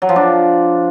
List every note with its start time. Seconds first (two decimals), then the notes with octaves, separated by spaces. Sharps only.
0.02 F#3
0.09 F3
0.16 D4